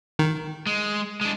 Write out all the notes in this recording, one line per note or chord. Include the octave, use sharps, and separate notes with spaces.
D#3
G#3
G#3 D4